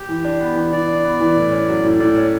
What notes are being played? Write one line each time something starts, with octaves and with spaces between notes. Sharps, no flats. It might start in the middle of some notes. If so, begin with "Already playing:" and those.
Already playing: G4
E3
D4
B3
E3
E3 D5
D4
B3
E3
A2
C#4
F#3
A2
A2 D5
C#4